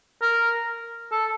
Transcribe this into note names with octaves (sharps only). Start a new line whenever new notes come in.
A#4
A4